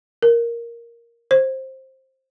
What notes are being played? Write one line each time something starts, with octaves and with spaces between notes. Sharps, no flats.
A#4
C5